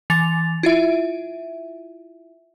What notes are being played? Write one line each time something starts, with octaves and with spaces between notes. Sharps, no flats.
E3 A6 F7
E4 F4 E5